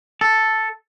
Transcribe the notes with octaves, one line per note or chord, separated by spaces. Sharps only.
A4